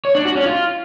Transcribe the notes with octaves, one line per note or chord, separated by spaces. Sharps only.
C#5
D4
F#4
C#4
F4